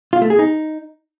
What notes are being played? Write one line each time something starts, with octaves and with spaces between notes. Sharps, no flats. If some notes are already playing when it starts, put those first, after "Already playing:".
F4
A3
G#4
D#4